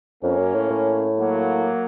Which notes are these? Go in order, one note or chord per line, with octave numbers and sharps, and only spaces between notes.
F2 A#3 C#4
F#2
A2
A2
F#3 A#3